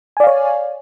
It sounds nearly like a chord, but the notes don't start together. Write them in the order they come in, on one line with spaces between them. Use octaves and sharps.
G#5 D5 F5 C#5